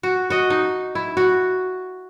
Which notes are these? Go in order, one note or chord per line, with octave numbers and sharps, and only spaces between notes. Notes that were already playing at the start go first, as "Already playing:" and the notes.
F#4
F#4 D#5
D#4
E4
F#4